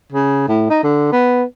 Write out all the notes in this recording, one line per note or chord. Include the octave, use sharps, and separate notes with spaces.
C#3
A2
D#4
D3
B3